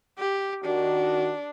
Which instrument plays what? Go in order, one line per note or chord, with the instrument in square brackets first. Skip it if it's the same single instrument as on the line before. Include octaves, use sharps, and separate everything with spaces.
[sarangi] G4
[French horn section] D#3 F#4 [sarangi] D4